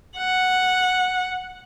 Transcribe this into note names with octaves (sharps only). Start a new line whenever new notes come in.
F#5